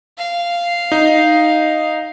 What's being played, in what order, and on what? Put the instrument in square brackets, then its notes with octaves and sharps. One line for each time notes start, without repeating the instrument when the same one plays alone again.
[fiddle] F5
[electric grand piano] D#4